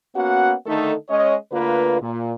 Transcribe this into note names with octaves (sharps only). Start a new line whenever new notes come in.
A#3 B3 C#4 F#4 F#5
D3 D#3 A3 D#4 A4
G#3 C#4 C#5 D#5
D2 D3 A#3 F4 B4
A#2